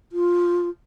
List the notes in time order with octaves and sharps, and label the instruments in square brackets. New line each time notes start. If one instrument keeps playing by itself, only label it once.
[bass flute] F4